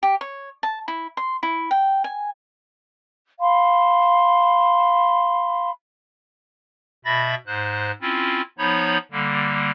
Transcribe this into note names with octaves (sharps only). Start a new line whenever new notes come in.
G4
C#5
A5
E4
C6
E4
G5
G#5
F5 B5 C6
B2 E5 B5 A6 A#6
G#2 C5 F#6
C4 C#4 E4 F4
F3 B3 D#4 C#5 B5 G6
D3 G3 A#3